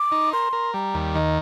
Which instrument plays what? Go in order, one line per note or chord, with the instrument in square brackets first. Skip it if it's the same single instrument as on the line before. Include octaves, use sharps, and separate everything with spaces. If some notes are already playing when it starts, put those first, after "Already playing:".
Already playing: [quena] D6
[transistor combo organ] D#4
[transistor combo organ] A#4 [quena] C6
[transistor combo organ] A#4
[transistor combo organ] G3 [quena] A#5
[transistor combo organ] D#2
[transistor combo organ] D#3 [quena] D#5